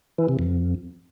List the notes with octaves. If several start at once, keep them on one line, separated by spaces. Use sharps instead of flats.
E3
C3
F2